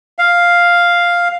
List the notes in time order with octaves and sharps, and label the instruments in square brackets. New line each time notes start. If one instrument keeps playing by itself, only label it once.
[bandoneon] F5